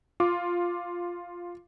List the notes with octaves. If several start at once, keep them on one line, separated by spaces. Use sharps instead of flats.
F4 D6